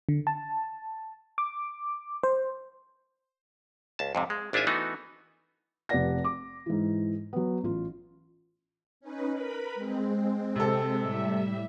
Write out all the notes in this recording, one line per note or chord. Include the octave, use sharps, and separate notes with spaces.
D3
A5
D6
C5
C#2 A5
F2 G#2 C3
G#3
G#1 D4 E4 F4 E5 G#5
E3 A3 B3 D#4 F#4
F1 G4 B4 D5 F#5 A#6
D6
G#2 E3
F#3 B3
A1 F4
C#4 D#4 B4
A#4 B4 B5
G#3 C4
C3 A4
A2 G3 E5